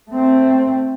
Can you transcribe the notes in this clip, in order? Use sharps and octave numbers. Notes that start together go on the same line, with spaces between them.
A3 C4